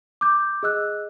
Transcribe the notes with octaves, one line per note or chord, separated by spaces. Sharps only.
D6 G6
G#4 D#5 E6 F#6